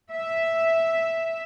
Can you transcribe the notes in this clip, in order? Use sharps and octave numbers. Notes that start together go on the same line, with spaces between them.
E5